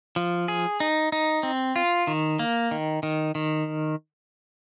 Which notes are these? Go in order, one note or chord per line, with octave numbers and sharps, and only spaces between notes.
F3
G#4
D#4
D#4
C4
F4
D#3
A#3
D#3
D#3
D#3